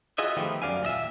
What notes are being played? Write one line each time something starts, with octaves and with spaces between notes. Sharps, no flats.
F4 F#4 G#4 D#5 E5
D#3 F3 A3 B3 G4
F#2 D5 F5 G#5
D#2 A#2 D#5 E5